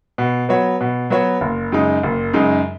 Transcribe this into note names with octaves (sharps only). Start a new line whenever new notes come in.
B2
F#3 B3 F#4 C#5
B2
F#3 B3 F#4 C#5
F#1
F#2 C#3 G#3 D#4
F#1
F#2 C#3 G#3 D#4